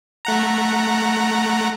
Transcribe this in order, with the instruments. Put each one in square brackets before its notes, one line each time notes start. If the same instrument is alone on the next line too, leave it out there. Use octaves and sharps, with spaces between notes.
[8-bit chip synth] A3 F#5 A#5